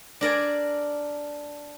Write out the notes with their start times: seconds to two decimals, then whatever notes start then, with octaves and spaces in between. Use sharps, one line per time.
0.21 D4 A#4 D5 G#5